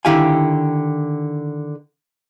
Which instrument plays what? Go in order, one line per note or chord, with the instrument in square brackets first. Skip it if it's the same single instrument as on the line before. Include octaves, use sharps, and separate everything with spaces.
[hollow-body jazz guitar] D3 D#3 E4 G4 F5 G#5